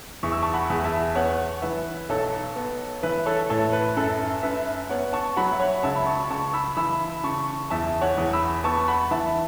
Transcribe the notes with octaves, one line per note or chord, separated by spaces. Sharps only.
E2 C#6
E6
A5 C#6
F#5 B5
E2
E5 A5
B3 C#5 F#5
E3 B4 E5
B1 A4 C#5
B3
E3 B4 E5
A4 C#5
A2 A4 C#5
B4
F#2 A4
F#2 B4 E5
B3 C#5 F#5
A5 C#6
F#3 F#5 B5
E5
C#5 F#5
C#2 E5 A5
B5
A5 C#6
C#2 A5 C#6
B5 E6
E3 B5 E6
C#3 A5 C#6
E2 E5 A5
C#5 F#5
E2
B5 E6
B3 A5 C#6
F#5 B5
E3 E5 A5